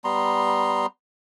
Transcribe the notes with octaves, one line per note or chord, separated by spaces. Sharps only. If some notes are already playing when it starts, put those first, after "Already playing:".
G3 B3 A#5 C6